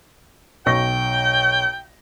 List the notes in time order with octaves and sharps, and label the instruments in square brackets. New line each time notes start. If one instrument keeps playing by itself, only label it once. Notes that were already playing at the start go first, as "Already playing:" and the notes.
[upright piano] B1 C#6 A#6 [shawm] G5